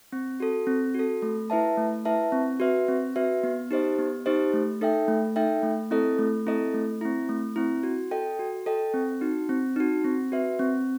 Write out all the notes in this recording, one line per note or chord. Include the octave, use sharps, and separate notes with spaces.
C4
F#4 A4
C4
F#4 A4
A3
E4 B4 E5 A5
A3
E4 B4 E5 A5
C4
F#4 B4 E5
C4
F#4 B4 E5
B3
D#4 G4 C5 D#5
B3
D#4 G4 C5 D#5
A3
D#4 A4 E5 G5
A3
D#4 A4 E5 G5
A3
C4 E4 A4 D#5
A3
C4 E4 A4 D#5
A3
C4 E4
A3
C4 E4
F#4
A4 D#5 G5
F#4
A4 D#5 G5
C4
D#4 F#4
C4
D#4 F#4
C4
F#4 B4 E5
C4